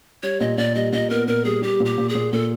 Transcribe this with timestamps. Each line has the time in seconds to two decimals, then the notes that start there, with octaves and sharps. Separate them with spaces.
0.23 G3 C#5
0.40 A#2 D#5
0.57 A#2 D5
0.75 G3 D#5
0.92 A#2 D#5
1.10 B3 A#4
1.28 A#2 A#4
1.45 G3 G#4
1.62 G3 G4
1.80 A#2
1.85 G4
1.98 A#2
2.09 G#4
2.15 A#2
2.32 A#2 A4